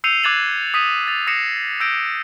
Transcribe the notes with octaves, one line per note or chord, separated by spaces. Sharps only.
E6 G6 C7 C#7 D#7 F7
D6 F#6 G#6 A6 E7 F#7
D#6 B6 D#7
A6 F7
D#6 A#6 C7 C#7 E7
E6 G6 A#6 D7